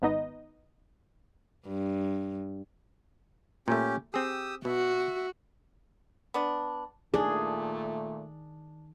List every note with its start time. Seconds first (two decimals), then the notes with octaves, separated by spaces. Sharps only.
0.02 G#1 B3 D#4 D#5
1.68 G2
3.68 A#2 A3 C#4 G4
4.14 C4 G4 G#4 D#6 E6
4.65 B2 F#4 E5
6.34 B3 D4
7.14 A#2 D#3 A3 D4 G#4